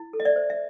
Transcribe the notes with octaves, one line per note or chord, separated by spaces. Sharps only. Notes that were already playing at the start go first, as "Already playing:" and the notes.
Already playing: E4
A4
D#5
D5 E5
C5
E5